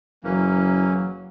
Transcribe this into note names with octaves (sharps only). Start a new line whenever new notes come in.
F#1 E3 F#3 A#3 C#4